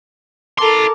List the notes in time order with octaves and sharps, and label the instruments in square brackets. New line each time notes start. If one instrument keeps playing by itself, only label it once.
[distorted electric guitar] E4 C6 [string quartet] A4 A#4 A5 [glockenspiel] D6